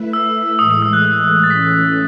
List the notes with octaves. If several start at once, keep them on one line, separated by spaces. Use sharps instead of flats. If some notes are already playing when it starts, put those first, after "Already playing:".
Already playing: A3 E4 B4 E5
E6
A2 E3 G#3 D#6
D#6
E6
F#6
F#6
A6
E3 A3 C#4 B6